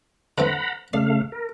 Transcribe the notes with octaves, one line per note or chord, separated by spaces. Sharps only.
D3 E3 C4 F#5 A#5 B5
C#3 A3 D5 F5
A#4